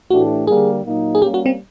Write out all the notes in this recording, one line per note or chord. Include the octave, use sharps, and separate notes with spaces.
A2 E3 A3 D4 F#4 G4
D3 G3 A#3 G#4
A#2 F#3 A#3 D#4
G#4
G3 A#3 C#4 G4
F#4
C4